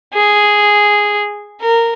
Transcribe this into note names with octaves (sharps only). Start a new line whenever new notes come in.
G#4
A#4